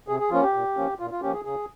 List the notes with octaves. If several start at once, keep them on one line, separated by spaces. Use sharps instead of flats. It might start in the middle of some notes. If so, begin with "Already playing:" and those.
C3 G#4
G#4
F3 A#3 C#4 F4
G4
A#2
F3 A#3 C#4
A#2 F4
F4
F3 A#3 C#4 G4
G#4
C#3 G#4